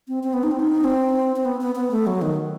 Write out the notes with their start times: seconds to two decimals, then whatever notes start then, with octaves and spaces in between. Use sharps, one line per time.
0.08 C4
0.23 C4
0.33 B3
0.43 D#4
0.51 C4
0.60 D#4
0.84 C4
1.36 C4
1.45 B3
1.61 B3
1.76 B3
1.91 A3
2.07 F#3
2.22 D#3